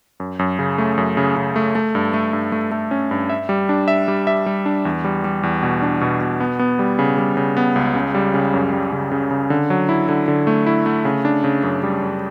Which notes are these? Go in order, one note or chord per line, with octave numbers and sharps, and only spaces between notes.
F#2
F#2
C#3
A3
F#2
C#3
C#3
A3
A3
G2
A3
G2
A3
A3
C#4
G2
E5
G3
D4
E5
G3
E5
G3
D4
E2
G3
G3
E2
B2
D4
B2
B2
B3
B3
G3
C#3
G3
C#3
B3
C#2
C#3
G3
C#3
F#2
G3
C#3
C#3
C#3
D3
F#3
E4
D3
D3
A3
E4
A3
C#3
D4
C#3
F#2
G3
F#2